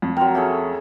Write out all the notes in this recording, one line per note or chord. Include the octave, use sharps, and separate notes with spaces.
F2
F#3 A#4 G5 C6
A3 C#4 G#4